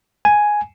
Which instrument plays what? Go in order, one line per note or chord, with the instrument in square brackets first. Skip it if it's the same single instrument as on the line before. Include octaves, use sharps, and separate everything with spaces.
[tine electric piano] G#5